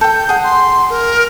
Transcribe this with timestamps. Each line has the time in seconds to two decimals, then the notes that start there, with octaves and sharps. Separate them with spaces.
0.01 A4 G5 G6
0.29 G#4 F#5
0.44 C6
0.90 A#4